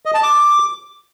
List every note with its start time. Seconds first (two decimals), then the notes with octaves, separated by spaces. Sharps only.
0.06 D#5
0.14 A5
0.23 D6